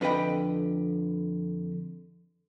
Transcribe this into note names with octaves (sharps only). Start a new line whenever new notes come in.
F2 D3 B4 D#5 G5 B5